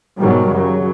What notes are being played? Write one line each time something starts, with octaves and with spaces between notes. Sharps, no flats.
G#2 B2 D#3 F#3 G3
F#2 C#3 F#3